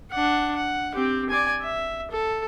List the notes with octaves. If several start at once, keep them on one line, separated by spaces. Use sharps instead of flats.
D4 F#5
F#5
C4 G4
D5 G#5
E5
A4